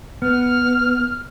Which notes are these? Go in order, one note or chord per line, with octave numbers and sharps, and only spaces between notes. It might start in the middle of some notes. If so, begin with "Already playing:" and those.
B3 F6